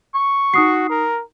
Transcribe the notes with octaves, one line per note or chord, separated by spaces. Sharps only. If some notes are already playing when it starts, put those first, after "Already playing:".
C#6
D#4 F#4 D#6 C7
A#4